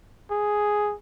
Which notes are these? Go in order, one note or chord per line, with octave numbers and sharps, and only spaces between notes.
G#4